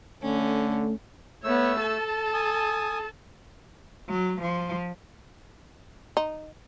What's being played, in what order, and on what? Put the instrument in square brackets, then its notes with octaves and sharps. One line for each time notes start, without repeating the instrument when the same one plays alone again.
[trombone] D3 [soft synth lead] A3 [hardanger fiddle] C#4
[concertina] A3 E6 [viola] B3 C#5
[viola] A4 A5
[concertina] G#5 D#6
[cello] F#3
F3
[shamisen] D#4